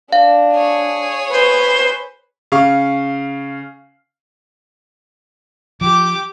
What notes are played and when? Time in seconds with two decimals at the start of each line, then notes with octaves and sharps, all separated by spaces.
0.12 D4 F5
0.53 G#4 C#5
1.32 B4 C5
2.52 C#3 F5 C#6
5.81 F3 G4 D6